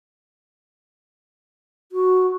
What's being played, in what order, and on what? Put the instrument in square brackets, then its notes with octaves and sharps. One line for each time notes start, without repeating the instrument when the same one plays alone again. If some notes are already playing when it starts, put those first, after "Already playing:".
[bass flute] F#4